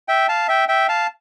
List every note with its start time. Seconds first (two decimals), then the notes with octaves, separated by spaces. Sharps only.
0.08 E5 G5
0.29 F5 A5
0.48 E5 G5
0.68 E5 G5
0.89 F5 A5